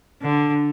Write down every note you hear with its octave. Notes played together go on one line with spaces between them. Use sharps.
D3